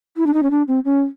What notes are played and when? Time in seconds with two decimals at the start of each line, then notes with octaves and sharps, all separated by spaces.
0.17 E4
0.27 D4
0.34 D#4
0.43 C#4
0.51 D4
0.68 C4
0.85 C#4